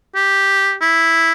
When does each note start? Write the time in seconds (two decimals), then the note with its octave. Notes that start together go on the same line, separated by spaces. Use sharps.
0.15 G4
0.81 E4